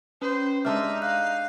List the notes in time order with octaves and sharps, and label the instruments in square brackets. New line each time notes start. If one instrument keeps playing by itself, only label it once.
[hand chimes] C#4 [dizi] B4 [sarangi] C5
[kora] G#3 D4 G4 [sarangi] D#4 [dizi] E5 [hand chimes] F6
[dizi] F5 [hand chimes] F#6